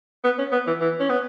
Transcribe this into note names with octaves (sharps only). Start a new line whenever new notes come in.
B3
C#4
B3
E3
E3
C#4
B3